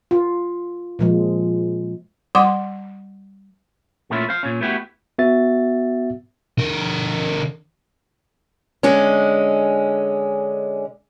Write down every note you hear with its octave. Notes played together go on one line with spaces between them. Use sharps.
F4
A#2 F3 G#3
G3 F#5 C6 D6
A#2 A3 B3 C#4 E4 F4
C5 F5
A#2 C#4
A3 B3 E4 F#4 G4
B3 F#4 E5 A6
D3 A#4
D3 G#3 C#4